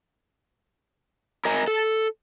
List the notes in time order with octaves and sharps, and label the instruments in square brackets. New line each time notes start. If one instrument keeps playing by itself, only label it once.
[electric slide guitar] A#4 D#5 G#5 A#5
A4